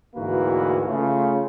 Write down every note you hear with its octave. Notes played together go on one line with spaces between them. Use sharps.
D2 G#2 E3 A#3 F#4 B4
C#3 A3 F4